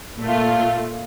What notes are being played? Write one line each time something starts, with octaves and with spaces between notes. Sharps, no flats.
A#2 A3 F4